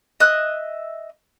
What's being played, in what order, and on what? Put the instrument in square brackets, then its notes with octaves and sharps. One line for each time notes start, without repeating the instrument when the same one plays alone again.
[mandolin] D#5 E5 F#6